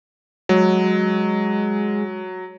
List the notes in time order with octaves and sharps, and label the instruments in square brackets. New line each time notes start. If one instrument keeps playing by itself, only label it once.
[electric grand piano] F#3 [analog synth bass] G#3